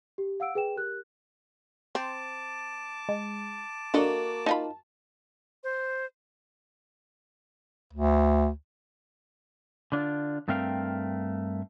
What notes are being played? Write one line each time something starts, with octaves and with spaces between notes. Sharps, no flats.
G4
F5 F#5 E6 D7
G#4 B4 G5 E7
G4 A#4 F#6
C4 A5 D6
G#3
A#3 D4 F#4 A4 D#5
D#4 F4 A5 B5
C5
D2
D3 D4 F4
G2 A3 C4 A#4 F5 G5